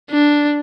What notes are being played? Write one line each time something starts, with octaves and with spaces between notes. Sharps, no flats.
D4